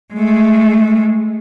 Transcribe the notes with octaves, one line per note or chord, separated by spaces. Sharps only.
G#3 A3